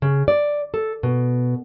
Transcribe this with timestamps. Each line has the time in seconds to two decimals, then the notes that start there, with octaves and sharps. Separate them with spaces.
0.02 C#3
0.28 D5
0.74 A4
1.03 B2